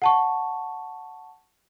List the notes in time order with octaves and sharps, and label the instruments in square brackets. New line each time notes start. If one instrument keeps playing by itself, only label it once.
[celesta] F#5 A5 C#6